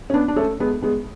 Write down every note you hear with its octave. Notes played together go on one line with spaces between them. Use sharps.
C#4
B3 D4
D4
A3 C#4
G#3 B3
G#3 B3